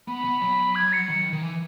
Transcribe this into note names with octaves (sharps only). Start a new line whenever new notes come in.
B3 B5
B3
F#3
G#6
C#7
D#3
D#3
E3